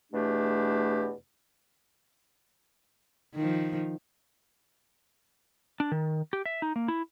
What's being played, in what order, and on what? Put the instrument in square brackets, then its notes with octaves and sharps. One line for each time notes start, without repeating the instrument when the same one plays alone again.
[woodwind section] E2 B2 A3 D4 G4
[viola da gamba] D#3 F3
[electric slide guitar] D4
D#3
G4
E5
D#4
A#3
E4